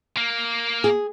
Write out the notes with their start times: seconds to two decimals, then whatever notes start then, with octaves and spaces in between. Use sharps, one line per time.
0.17 A#3
0.84 G#4